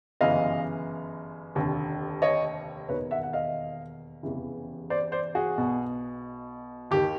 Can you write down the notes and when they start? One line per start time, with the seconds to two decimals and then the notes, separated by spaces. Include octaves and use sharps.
0.21 G1 F#2 C#3 E3 D#5 F5
1.55 F1 D#2 D3
2.22 C#5 D#5
2.89 E1 D#2 D#3 B4 C#5
3.11 E5 F#5
3.23 F#5
3.33 D#5 F5
4.23 F1 E2 C#3 E3
4.90 C5 D5
5.12 C5 D5
5.35 F#4 G#4
5.58 B1 B2
6.91 D#2 D#3 G4